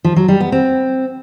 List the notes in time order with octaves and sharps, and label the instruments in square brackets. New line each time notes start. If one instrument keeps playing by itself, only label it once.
[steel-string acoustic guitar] F3
F#3
G3
B3
C4